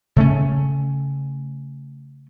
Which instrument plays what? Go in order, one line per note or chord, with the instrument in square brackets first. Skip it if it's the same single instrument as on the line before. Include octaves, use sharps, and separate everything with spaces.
[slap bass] C#3 A3 C#4